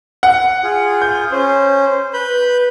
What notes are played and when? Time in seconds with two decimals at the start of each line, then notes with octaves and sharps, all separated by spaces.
0.23 F#5
0.63 F4 G#4
1.02 G6
1.32 C#4 C5
2.13 B4 B5 G6